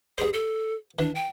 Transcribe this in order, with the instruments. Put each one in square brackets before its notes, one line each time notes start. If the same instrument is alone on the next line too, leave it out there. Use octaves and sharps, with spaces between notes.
[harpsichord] G2 C5 [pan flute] G#4
[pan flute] A4
[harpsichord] E3 [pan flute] D4
[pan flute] G5